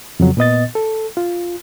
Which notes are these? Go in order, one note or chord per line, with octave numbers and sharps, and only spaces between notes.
F2 C#3 F#3
A#2 B3 D#5 A6
A4
F4